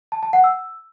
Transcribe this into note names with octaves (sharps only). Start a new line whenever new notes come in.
A5
A5
F#5
E6